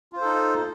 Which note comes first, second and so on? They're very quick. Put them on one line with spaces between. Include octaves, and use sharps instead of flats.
F4 C5 A4 D#4